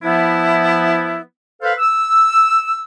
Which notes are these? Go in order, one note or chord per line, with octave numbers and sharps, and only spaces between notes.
F3 B3 E4
A4 B4 C5 F5
E6